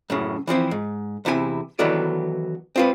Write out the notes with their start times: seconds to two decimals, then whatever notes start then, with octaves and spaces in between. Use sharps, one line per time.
0.10 F#2 A2 C#3
0.47 E3 F3 C4 E4
0.71 G#2
1.25 E2 C3 E4 A#4 G#5
1.79 D#3 E3 F#3 B3 A4 D5
2.76 C4 F4 B4